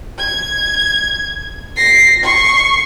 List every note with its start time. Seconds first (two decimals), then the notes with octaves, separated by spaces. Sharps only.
0.18 G#6
1.76 A#6 C7
2.24 C#6 C7